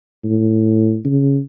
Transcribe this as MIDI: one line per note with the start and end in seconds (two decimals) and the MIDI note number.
0.24 0.98 45
1.05 1.40 49